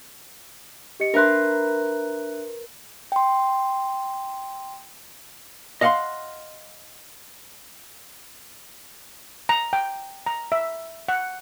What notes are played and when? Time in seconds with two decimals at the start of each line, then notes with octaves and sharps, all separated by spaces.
1.00 G4 D#5 C#7
1.14 D4 A#4 B4 E5 C6 F#6
3.12 G5 C6
5.81 D#5 F5 F#5 B5 C6
9.49 A#5
9.73 G5
10.26 A#5
10.52 E5
11.09 F#5